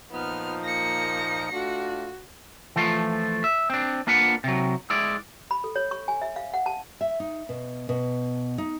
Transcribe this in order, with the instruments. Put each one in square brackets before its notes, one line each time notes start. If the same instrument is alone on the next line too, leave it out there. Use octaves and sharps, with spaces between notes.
[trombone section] A#2 F3 D#4 [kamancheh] B3 F6
[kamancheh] A#3 [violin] A#6 C#7
[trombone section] A3 D4 F4 [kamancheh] F#4
[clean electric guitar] E3 F3 A3 F4
E5
C4 D4
A#3 D4 F4 B4 F#5
C3 F#3
G#3 E4 D5
[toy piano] B5
A4
C#5
C#6
G#5
E5
F5
F#5
A5
[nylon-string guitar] E5
D#4
B2
B2
D#4